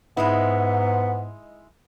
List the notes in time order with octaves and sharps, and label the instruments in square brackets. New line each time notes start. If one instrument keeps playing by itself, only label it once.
[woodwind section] G#2 [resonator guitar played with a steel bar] G#3 D#4 E4 [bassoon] B3